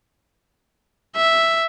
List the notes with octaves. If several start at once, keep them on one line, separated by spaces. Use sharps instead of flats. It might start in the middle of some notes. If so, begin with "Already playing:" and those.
E5